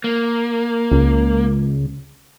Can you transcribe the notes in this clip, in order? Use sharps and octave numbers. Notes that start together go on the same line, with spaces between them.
A#3
C#2